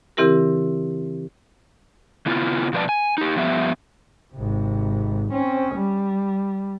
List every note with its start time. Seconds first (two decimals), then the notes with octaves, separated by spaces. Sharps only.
0.17 C#3 E3 C4 E4 G4 A#4
2.26 C#3 B3 E4 F4
2.73 B2 F3 B4 C5 D5 A5
2.89 G#5
3.18 D#4 G4
3.36 G2 F3 B3 G4 E5
4.34 G#1 C3
5.31 C4 C#4
5.74 G3